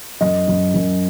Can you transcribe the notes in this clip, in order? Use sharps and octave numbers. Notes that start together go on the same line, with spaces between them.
F#2 D#5
F#2
F#2